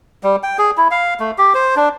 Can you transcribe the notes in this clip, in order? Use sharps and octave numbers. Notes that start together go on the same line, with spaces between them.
G3
G5
G#4
E4
F5
A3
G4
C5
D4